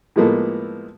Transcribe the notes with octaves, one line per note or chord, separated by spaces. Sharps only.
A2 F3 G#3 A#3 B3 A4